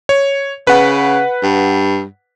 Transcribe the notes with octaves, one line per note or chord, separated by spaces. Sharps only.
C#5
C#3 B4 F#5
G2